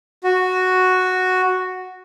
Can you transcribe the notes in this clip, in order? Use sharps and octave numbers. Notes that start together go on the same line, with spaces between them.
F#4